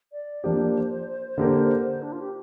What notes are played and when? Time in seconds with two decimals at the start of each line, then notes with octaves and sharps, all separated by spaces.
0.12 D5
0.44 F3 A#3 D4 G4 C5
1.38 D3 A#3 G4 A#4
2.02 D4
2.12 F4
2.21 G4